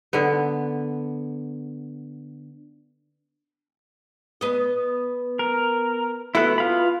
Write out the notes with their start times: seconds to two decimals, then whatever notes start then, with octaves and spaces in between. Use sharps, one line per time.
0.13 D3 B3
4.41 B3 D#5
5.39 A#4
6.35 B3 E4 F#4 A4 B4
6.58 F4 F5 B5